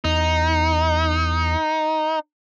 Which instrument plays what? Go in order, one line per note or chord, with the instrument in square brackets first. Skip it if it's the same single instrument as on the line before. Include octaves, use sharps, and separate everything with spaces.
[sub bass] E2 [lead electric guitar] D#4